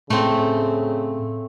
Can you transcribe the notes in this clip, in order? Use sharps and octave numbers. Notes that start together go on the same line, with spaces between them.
A2 C#3 A3 C4